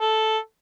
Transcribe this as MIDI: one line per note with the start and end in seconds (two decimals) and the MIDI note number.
0.01 0.37 69